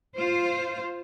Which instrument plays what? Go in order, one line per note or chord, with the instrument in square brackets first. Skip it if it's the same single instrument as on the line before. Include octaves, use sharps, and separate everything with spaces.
[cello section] F4 C5